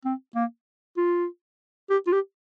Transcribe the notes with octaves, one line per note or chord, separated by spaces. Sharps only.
C4
A#3
F4
G4
F4
G4